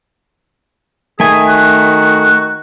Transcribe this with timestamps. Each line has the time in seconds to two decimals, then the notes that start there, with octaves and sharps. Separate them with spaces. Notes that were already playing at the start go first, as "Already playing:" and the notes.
1.20 D#3 A3 G#4 G#5
1.48 F#4